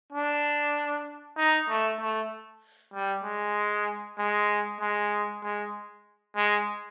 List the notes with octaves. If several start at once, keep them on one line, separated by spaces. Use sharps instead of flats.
D4
D#4
A3
A3
G3
G#3
G#3
G#3
G#3
G#3